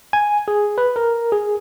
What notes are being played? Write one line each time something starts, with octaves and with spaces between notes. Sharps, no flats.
G#5
G#4
B4
A#4
G#4